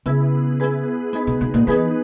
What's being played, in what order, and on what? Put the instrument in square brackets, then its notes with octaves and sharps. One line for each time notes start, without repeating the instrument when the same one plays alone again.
[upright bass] C#3 [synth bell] B3 E4 G#4 B4
[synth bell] B3 E4 G#4 B4
B3 D#4 G#4 B4
[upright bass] B2
B2
A#2
[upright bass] E3 [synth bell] B3 D#4 G#4 B4